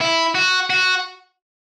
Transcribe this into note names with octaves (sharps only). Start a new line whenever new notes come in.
E4
F#4
F#4